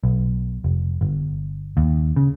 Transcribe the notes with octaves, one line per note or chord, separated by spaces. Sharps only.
B1
F1
G1
D#2
C#3